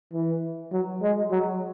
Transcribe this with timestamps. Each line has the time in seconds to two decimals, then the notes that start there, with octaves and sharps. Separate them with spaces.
0.13 E3
0.73 F#3
1.02 G#3
1.31 F#3